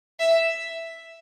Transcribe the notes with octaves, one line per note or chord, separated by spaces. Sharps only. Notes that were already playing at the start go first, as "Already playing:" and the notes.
E5